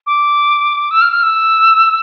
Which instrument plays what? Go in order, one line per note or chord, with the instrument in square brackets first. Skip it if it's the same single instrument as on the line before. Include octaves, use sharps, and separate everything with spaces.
[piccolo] D6
E6
F6
F6
E6